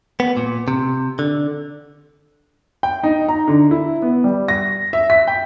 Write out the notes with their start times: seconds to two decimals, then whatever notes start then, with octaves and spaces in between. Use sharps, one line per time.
0.20 B3
0.37 A#2
0.68 C3
1.19 D3
2.83 G5
3.03 D#4
3.28 A#5
3.48 D3
3.71 E4
4.02 B3
4.24 G3
4.48 A#6
4.93 E5
5.10 B6
5.27 G5